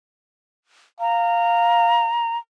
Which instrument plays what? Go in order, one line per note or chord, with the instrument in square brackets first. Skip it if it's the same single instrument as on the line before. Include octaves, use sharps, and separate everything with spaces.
[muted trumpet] F5 [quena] A#5